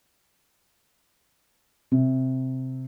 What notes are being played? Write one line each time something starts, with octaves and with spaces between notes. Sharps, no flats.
C3